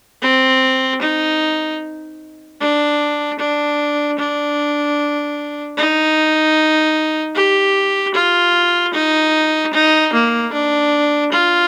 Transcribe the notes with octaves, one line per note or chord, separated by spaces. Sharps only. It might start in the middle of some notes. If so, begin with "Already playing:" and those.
C4
D#4
D4
D4
D4
D#4
G4
F4
D#4
D#4
A#3
D4
F4